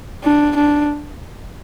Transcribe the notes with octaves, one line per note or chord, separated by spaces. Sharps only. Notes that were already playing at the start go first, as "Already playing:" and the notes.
D4
D4